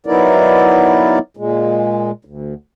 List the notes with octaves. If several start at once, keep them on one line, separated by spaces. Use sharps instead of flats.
F#3 B3 D#4 E4 A#4 D5
A#2 G#3
D2